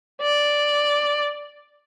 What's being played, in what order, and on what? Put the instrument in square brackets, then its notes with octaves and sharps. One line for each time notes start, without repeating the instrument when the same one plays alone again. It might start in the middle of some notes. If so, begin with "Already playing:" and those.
[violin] D5